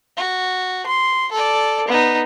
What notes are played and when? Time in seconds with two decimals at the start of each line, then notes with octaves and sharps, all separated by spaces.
0.17 F#4
0.86 C6
1.32 A4 D5
1.88 B3 D#4